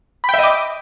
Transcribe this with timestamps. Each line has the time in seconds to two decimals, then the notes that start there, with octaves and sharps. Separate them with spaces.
0.24 B5
0.29 G5
0.34 E5
0.39 D#5
0.44 D6